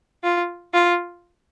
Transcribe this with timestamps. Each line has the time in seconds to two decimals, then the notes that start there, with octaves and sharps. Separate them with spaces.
0.24 F4
0.74 F4